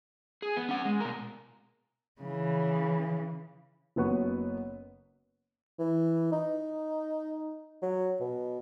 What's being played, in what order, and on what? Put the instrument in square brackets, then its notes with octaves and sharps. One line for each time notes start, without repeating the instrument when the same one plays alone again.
[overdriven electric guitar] G#4
B3
C#4 F#5
G#3
B2 A#4
[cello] C#3 E3
[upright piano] F#1 F#2 F#3 B3 B4 C#6
[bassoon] E3
D#4
F#3
B2